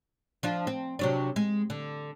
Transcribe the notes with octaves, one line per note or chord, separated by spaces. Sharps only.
F3 D4 F4
C4
C3 F#3 D4
G#3
D3